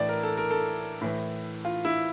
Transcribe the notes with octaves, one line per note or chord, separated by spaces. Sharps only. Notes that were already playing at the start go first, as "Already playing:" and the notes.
Already playing: A2 E3 D5
A#4
A4
A#4
A4
A2 E3
F4
E4